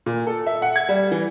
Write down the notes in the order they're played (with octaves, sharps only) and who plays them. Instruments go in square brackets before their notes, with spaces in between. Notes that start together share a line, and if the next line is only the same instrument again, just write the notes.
[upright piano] A#2
A4
E5
F#5
G#6
G3
E3